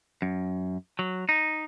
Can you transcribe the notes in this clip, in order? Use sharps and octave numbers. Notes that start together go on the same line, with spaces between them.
F#2
F#3
D#4